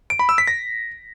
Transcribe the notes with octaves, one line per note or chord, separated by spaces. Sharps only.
D7
B5
E6
B6
A#6